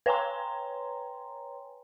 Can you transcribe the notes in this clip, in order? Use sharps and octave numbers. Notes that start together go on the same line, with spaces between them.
B4 C#5 G5 G#5 A#5 C6